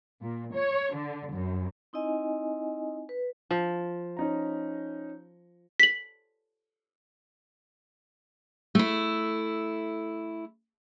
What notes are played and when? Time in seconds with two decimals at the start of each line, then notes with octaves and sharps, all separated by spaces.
0.21 A#2
0.52 C#5
0.93 D3
1.32 F#2
1.93 C4 D#4 E4 D#5 G#5
3.09 B4
3.51 F3
4.17 C#4 D#4 A#5
5.80 B6 F#7
8.75 A3 E4